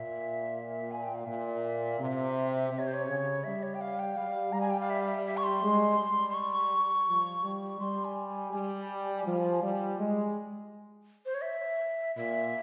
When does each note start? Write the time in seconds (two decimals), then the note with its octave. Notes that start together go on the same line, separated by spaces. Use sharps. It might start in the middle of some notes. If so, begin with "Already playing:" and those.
Already playing: A#2 E5
0.91 G#5
1.03 G5
1.15 F5
1.26 A#2 E5
1.99 C3
2.71 C3 E5
2.79 C#5
2.87 C5
2.94 C#5
3.07 C#3
3.44 G3 E5
3.63 C#5
3.74 G5
3.81 F5
3.99 G5
4.17 G3 F5
4.52 G3 A#5
4.61 G#5
4.70 G5
4.80 F5
4.90 E5
5.01 F5
5.08 E5
5.26 E5
5.37 C#6
5.44 C6
5.63 G#3
5.98 G3
6.30 C6
6.34 C#6
7.07 F3
7.43 G3
7.80 G3 C6
8.05 G#5
8.29 G#5
8.52 G3 G#5
9.25 F3
9.61 G3
9.98 G#3
11.26 C5
11.34 C#5
11.42 E5
12.16 A#2 E5